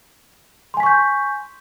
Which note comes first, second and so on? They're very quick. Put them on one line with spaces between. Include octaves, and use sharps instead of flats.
C6 G#5 B6 C#6 G6